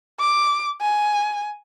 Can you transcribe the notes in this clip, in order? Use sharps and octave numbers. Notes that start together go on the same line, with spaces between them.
D6
G#5